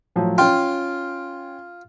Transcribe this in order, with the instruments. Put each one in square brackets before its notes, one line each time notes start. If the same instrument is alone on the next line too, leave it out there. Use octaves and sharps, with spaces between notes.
[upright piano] A2 F3 F#3
[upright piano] C#4 G5 [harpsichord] F4